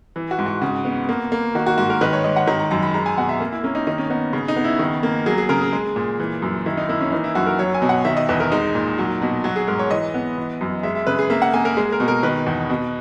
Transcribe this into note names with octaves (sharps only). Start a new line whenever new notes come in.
E3
F#4
G#2
F#4
C#3 F#4
B3
A#3
A#3
D#3 F#4
F#4
G#2 F#4
A#4
D#3 B4
C#5
G#2 D#5
F#5
D#3 A#5
A#5
F#2 A#5
B5
G#3 A#5
G#5
B2 F#5
E5
A#3
E4
A#3 C#4
D#4
D#3 D#4
C#4
B3 D#4
C#3
D#4
B3
E4
D#3
A#3
F#3 G#4
G#4
C#3 A#4
G#4
G#3
A#2
E3
F#2
D#3 E4
D#4
A#3 E4
C#4
E3 D#4
E4
F#2 F#4
A#4
F#3 C#5
G#5
B2
F#5
D#3 E5
D#5
E2 B4
A#4
G#3 D#4
A#2
F#3
B2
F#3 F#4
G#4
G#2 A#4
C#5
E3 D#5
B3
E3
F#2
G#3 E5
E5
C#3 B4
G#4
A#3 E5
F#5
A#3 G#5
A#4
G#3 G#4
A#4
B2
A#4
D#3 B4
E2
B2